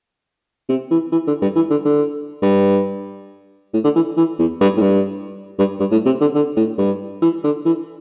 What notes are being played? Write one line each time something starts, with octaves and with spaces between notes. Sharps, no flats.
C3
E3
E3
D3
G2
E3
D3
D3
G2
A2
D3
E3
E3
E2
G2
A2
G2
G2
G2
A2
C3
D3
D3
A2
G2
E3
D3
E3